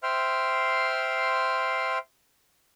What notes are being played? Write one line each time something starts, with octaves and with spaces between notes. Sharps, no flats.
C5 E5 G5 C6 F6